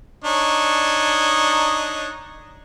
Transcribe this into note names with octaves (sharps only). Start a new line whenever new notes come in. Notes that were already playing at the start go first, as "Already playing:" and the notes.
D4 D#4 C#5